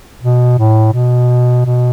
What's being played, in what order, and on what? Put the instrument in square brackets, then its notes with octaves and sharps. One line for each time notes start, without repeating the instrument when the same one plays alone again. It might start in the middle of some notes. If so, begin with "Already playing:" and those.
[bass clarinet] B2
A2
B2
B2